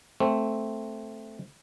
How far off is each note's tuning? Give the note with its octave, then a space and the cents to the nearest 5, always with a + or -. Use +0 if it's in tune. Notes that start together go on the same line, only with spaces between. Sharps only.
A3 +0 C4 +0